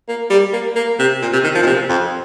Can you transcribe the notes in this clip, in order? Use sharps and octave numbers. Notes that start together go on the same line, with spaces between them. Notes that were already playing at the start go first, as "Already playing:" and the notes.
A#3
G3
A#3
A#3
C3
A#2
C3
D#3
F3
A#2
C3
F2